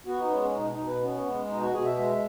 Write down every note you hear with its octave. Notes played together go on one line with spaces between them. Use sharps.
B3 F#4
D#4
G#3 C#4
C#4
B2 D#4
D#4
B2
B4
B3 C#4
G#3
B2 D#4
F#4
B2 G#4
E5
G#3